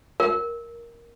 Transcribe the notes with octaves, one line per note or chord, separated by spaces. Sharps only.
A#4